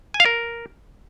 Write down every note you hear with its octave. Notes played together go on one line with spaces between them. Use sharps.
G#5
F5
A#4